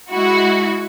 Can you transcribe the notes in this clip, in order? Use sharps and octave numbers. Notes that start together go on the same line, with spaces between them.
G#3 E4 F#4